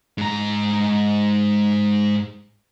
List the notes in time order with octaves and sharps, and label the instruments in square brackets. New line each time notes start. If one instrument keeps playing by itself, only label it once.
[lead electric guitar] G#2 A#5